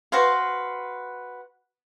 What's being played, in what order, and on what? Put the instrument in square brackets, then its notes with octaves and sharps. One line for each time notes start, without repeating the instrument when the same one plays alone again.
[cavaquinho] F#4 B4 C5 F5